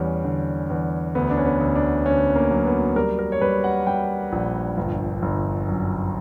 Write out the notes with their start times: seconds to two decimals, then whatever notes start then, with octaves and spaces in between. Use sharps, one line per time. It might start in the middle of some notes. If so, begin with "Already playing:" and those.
Already playing: E2 G3 C#4
0.24 D3
0.70 E2
1.15 D2 B3
1.30 D4
1.37 C#4
1.45 B3
1.61 D2
1.76 D4
2.05 D2 C#4
2.36 A#3
2.51 F#3
2.66 B3
2.96 G3 A#4
3.19 A#4
3.32 C#5
3.41 G3 B4
3.64 F#5
3.86 G3 G5
4.32 A#1
4.77 G1
5.22 G1
5.68 F#2